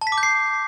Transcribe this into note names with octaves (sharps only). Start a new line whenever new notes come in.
A5
B6
D6
G6
C7